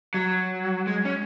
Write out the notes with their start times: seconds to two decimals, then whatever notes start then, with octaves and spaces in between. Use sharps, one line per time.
0.14 F#3
0.87 G#3
1.05 C#4